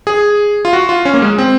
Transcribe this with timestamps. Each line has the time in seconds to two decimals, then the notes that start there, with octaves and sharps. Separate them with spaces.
0.07 G#4
0.65 F4
0.73 F#4
0.89 F4
1.05 C#4
1.14 A#3
1.22 G#3
1.38 C4